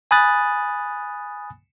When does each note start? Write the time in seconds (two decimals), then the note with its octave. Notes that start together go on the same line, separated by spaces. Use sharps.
0.11 G#5 B5 D#6 F#6 A6